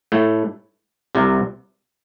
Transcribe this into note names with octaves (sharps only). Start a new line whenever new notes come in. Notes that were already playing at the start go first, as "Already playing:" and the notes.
A2 A3
C2 C3